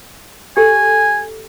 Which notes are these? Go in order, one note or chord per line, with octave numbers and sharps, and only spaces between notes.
G4 A4 G#5